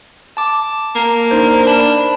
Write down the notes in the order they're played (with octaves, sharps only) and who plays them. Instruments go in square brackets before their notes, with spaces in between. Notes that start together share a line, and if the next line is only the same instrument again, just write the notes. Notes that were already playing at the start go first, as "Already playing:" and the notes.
[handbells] A5 D6
[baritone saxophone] A#3
[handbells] D4 D#4 C5
[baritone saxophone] D4 [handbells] B5